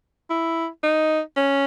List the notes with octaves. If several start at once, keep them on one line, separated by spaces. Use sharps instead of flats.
E4
D#4
C#4